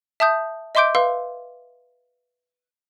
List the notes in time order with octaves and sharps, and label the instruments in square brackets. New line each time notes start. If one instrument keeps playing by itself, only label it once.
[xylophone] E5 A5 D#6 G6
D#5 E5 C6 D6 G6 D7
B4 F5 C6 E6